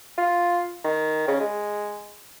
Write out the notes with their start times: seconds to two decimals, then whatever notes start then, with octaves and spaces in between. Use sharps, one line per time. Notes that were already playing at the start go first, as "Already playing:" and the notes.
0.18 F4
0.84 D#3
1.28 C#3
1.40 G#3